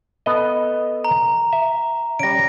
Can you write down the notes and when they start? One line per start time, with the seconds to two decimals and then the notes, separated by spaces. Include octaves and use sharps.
0.26 B3 A4 D#5
1.04 A#5
1.53 E5
2.19 G3 C#4 A#6 D7